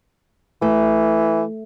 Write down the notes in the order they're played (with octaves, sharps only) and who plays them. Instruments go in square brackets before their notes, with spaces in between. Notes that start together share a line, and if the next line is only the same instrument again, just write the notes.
[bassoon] E3 [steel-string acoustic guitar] A3